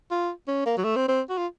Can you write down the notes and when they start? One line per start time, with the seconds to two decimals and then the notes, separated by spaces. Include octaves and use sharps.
0.11 F4
0.48 C#4
0.66 A#3
0.77 F#3
0.84 A3
0.96 C4
1.08 C4
1.29 F#4
1.38 F4